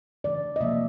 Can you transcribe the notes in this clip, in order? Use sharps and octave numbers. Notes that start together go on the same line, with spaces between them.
C#3 E3 A3 D5
D#5
C3 F3 A#3 E5